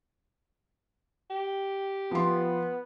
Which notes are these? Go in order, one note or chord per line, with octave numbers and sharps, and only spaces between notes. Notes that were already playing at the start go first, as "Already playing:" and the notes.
G4
F3 B3 C6